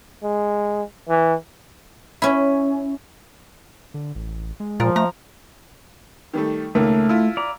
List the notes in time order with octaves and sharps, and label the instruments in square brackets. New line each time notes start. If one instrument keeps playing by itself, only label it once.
[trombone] G#3
E3
[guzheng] C#4 E4
[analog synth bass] D3
A1
G#3
[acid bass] A#2 [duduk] F3 [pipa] F4 A#4
[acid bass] A3 [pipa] A#5
[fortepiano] D#3 G3 A3
[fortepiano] C#2 D#3 A#3 [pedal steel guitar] A3
[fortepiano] E4 F4
[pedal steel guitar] D5 A#5